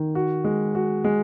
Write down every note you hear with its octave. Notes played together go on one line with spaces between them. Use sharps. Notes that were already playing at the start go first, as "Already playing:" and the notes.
Already playing: D#3
F#4
G#3
F#4
G#3